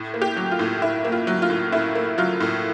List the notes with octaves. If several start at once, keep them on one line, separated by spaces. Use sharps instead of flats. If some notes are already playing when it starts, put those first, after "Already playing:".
Already playing: A2
A#3
G4
F#3
F4
A2
A2 E4
A#3
F4
F#3
F4
A2
A2 E4
A#3
F#3 F4
A2